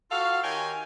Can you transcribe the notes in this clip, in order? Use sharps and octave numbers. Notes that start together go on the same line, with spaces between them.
F4 F#4 A4 F5
D#3 G4 C#5 G5 G#5